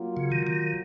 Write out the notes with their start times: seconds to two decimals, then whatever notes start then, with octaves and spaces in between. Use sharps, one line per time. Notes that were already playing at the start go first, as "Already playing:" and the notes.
Already playing: F#3 A#3 F4
0.17 C#3
0.32 D#3
0.47 D#3